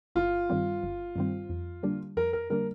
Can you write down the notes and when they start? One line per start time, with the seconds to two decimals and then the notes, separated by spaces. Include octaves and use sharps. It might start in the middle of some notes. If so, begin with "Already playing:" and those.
0.15 G1 F4
0.50 G2 D#3 G3 C4
0.83 G1
1.16 G2 D#3 G3 C4
1.49 F2
1.83 D3 G3 A#3 D4
2.17 F2 A#4
2.33 A#4
2.50 D3 G3 A#3 D4 A#4